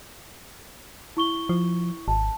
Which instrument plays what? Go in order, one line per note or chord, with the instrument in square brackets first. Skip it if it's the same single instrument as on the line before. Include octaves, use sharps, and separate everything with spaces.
[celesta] E4 C#6 G7
[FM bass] F3
[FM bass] G#1 [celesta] A5